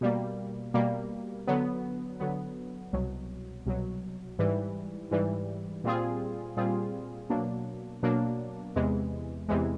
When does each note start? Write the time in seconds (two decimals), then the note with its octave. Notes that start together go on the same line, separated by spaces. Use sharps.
0.01 B2 G3 A#3
0.74 B2 G3 A#3
1.47 D3 F#3 B3
2.20 D3 F#3 B3
2.93 C2 B2 F#3
3.66 C2 B2 F#3
4.39 G#2 E3 G3
5.11 G#2 E3 G3
5.84 A#2 G3 C4 F4 G#4
6.57 A#2 G3 C4 F4 G#4
7.30 B2 F#3 A#3 D4
8.03 B2 F#3 A#3 D4
8.76 E2 C3 E3 G#3
9.49 E2 C3 E3 G#3